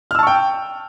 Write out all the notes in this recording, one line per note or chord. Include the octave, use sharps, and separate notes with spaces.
G5 A5 C#6 E6 F6